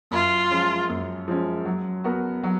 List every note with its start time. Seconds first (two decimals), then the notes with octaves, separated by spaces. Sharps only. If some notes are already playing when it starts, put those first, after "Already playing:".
0.11 F#2 F4
0.50 F3 G#3 C#4
0.89 F#2
1.28 F3 G#3 C#4
1.65 F#3
2.04 B3 F#4 A#4
2.43 F#3